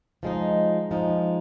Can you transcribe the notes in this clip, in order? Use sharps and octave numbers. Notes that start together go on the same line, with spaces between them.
F3 G#3 D#4
F3 G#3 D#4